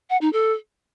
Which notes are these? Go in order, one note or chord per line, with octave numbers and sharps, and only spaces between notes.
F#5
D#4
A4